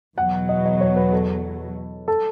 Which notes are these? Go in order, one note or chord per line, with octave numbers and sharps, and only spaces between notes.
E2 B2 F#3 F#5
D#5
D#5
C#5
B4
A4
A4